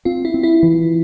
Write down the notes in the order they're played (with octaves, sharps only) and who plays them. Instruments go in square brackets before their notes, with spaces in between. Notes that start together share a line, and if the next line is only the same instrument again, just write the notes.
[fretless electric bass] C4 [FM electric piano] F4
[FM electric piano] E4
[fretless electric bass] C4
[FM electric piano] E4
[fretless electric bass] E3